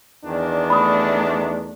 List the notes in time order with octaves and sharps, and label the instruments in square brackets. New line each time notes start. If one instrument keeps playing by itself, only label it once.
[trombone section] E2 D#3 D4
[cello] A3 [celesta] B5 D#6